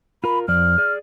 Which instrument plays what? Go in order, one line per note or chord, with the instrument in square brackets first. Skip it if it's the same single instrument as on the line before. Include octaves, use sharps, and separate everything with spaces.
[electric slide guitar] F4 A#4 [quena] B5
[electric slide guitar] F2 F3 D5 [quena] F6
[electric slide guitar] G#4 D5